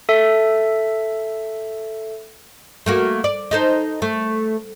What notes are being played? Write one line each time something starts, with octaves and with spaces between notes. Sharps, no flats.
A4 E5
A3 A#3 F#4
D5
D#4 A4 C5
A3